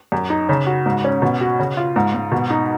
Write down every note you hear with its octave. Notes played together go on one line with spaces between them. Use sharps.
F#2
D#4
C#3
F#4
G#2
C#4
B2
F#4
C#3
F4
G#2
G#2
B2
D#4